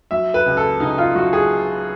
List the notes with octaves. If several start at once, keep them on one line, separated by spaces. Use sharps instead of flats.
F#3 E5
B4
C#2
A4
C#2 D#4
F4
F#3 F#4
G#4